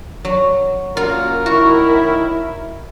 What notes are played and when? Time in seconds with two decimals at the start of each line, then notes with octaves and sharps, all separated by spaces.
0.25 F#3
0.97 A#3 C#4 F4 F#4 A#4
1.46 A2 D#3 E4 F#4